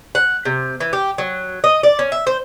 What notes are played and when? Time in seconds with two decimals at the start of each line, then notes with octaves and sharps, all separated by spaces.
0.15 F#5
0.45 C3
0.80 E3
0.93 G4
1.18 F#3
1.64 D#5
1.83 D5
1.99 C#4
2.12 E5
2.27 C5